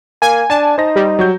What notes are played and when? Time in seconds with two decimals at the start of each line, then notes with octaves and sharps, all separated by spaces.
0.22 A#3 G#5
0.50 D4 G#5 A5
0.78 D#4 C5 A#6
0.96 G3
1.19 F#3 F#4 G6